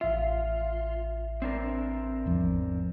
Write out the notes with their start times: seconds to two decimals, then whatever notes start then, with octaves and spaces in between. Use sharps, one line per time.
0.01 A1 F4 E5
1.42 C4 D4 A#4
2.25 G#1 E2 F3